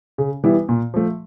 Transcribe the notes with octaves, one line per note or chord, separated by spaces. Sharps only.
C#3
E3 G3 B3 E4
A#2
F3 A3